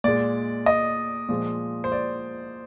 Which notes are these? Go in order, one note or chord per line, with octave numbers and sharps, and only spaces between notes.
A#2 G#3 D5
D#5
A#2 F3 G#3
C5
D5